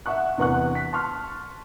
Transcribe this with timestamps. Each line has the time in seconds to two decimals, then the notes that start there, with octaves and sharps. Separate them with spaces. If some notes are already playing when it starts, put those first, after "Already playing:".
0.06 E5 F#5 C#6 F#6
0.38 E2 C3 B4 F#5 C#6 F#6
0.75 B6
0.93 A5 C6 C#6 F6